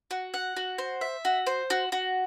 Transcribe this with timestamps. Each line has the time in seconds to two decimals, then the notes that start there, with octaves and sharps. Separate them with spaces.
0.11 F#4
0.34 F#5
0.57 F#4
0.78 C5
1.01 E5
1.25 F#4
1.47 C5
1.70 F#4
1.92 F#4